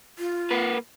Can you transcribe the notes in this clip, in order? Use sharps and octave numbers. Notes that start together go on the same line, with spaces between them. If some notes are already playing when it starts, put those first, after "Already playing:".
F4
A#3 B4